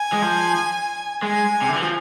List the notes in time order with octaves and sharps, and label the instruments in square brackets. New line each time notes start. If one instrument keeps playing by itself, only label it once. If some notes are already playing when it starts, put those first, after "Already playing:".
Already playing: [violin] G#5
[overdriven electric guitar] G#3
F3
[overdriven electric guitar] G#3 [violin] G#5
[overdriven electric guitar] C3
D3
E3
F3